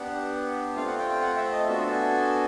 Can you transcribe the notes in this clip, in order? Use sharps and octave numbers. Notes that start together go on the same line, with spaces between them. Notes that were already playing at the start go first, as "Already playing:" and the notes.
Already playing: B3 D4 G4 F#5
A3 C4 F4 F5
F#5
G5
G5
F#5
E5
D#5
B3 D4 F#4 A4 E5
G#5